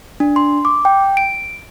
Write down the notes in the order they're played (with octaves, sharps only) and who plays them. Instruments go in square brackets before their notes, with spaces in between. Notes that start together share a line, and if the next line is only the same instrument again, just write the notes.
[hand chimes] D4
C6
D6
G5
D7